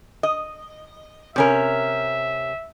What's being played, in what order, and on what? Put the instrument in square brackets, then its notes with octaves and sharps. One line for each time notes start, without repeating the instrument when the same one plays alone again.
[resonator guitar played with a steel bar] D#5
[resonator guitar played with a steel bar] C3 C#4 A#4 [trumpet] E5